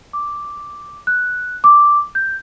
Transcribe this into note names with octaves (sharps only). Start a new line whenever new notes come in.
D6
F#6
D6
G6